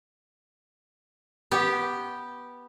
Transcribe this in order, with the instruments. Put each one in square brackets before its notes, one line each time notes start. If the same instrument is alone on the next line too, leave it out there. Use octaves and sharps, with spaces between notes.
[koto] B3 G4